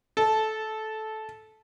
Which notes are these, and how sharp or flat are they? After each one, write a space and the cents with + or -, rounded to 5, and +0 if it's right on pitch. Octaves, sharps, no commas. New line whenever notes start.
A4 -15